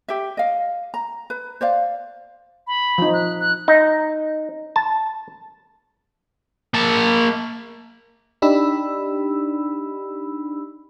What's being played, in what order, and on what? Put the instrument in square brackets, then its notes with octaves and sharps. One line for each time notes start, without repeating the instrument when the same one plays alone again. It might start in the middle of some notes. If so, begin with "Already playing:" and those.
[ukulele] G4 E5
D#5 F5
A#5
B4
C5 D5 F5
[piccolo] B5
[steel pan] F3 D#4
[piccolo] F#6
F#6
[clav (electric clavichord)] D#4
A5
[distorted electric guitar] A#3 A5
[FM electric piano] D4 D#4 G4 B5 E6